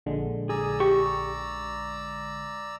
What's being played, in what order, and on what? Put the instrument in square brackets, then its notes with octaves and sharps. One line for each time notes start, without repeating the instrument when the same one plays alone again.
[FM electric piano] A#1 D3 G#3
[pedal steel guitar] G#4 [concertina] D5 A#5 E6
[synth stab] G4 [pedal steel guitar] C#6